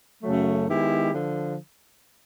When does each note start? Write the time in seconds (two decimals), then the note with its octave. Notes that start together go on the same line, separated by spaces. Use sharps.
0.23 F#2 C#3 F#3 A3
0.67 D#3 G#3 B3 E4 G4
1.12 D3 F3